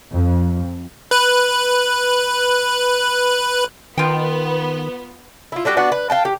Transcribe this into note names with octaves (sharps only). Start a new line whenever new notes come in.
F2
B4 F#6
D#3 B3 F4 B4 G5
E4 F4
G3 D4 F#4 G4
B3 D4 F#4
B4
F5 G5 A5
G4